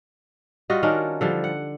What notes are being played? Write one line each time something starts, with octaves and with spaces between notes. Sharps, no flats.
G3 F4 F#4 D#5
D#3 C#4 D4 A#4
D3 F3 G3
F#5